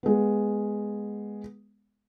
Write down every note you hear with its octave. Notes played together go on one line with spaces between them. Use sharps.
G#3 B3